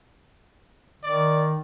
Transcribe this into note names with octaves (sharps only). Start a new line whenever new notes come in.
D#3 D5